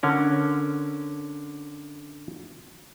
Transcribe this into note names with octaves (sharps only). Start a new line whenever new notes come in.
D3 C#4 A#4